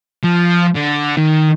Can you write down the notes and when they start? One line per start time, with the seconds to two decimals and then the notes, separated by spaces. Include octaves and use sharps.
0.24 F3
0.75 D3
1.17 D#3